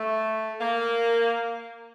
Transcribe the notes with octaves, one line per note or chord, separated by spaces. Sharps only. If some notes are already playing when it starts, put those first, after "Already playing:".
Already playing: A3
A#3